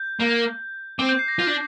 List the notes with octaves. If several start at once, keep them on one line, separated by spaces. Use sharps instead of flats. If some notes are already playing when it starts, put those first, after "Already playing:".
Already playing: G6
A#3
C4 D6
G6
C7
A#6
F4 G6
D4